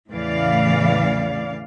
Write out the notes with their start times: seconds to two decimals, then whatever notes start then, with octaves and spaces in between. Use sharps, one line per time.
0.10 E2 A2 C#3 E3 D5 F5